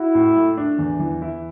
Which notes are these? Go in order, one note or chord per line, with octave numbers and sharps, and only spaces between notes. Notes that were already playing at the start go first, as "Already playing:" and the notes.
Already playing: E4 F#4
A2
A3
D4
E2
E3
E4